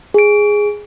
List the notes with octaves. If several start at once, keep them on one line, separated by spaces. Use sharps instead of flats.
G#4 D7